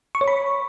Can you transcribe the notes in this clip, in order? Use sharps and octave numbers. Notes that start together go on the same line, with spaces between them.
C#6
C#5
B5